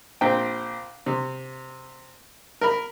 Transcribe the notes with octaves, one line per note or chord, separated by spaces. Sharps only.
A#1 C4 G5
C3
A#4 B5